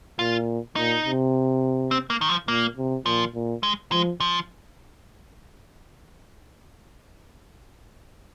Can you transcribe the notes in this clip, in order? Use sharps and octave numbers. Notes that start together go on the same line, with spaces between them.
A#2 F4
A#2 D#4
C3
C4
A#3
D#3
F3
A#2 A#3
C3
A#2 F3
A#2
G#3
F3 G#3
F3